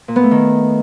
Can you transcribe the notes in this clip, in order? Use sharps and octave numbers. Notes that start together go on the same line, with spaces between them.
A#2
B3
A3
D#3